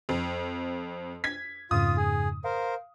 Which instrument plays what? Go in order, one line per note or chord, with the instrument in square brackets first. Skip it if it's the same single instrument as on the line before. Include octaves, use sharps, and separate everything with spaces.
[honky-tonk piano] F2
G#6 B6
[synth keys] F2 G#2 C#3 [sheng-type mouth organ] F4 [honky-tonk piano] D#6
[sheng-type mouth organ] G#4
[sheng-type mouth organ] A#4 C5 [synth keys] F5